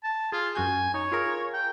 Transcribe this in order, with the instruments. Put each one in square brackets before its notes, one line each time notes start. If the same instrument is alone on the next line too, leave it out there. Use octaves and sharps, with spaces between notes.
[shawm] A5
[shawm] F4 [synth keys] G#4
[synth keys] F#2 F#4 G6 [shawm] G#5
[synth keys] D#4 [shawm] C#5
[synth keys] F4 G#4 A#4
[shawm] G5